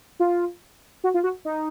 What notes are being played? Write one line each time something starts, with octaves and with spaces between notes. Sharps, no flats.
F4
F#4
F4
F#4
D#4